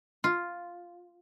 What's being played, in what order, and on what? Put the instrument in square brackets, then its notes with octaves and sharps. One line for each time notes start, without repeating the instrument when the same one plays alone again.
[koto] F4